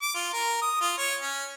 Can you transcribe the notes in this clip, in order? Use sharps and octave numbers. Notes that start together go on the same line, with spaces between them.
D6
F4
A#4
D#6
F4
C#5
C#4